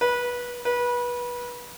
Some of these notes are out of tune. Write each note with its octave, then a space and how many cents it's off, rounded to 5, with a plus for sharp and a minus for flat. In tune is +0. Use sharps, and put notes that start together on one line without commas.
B4 -20
B4 -25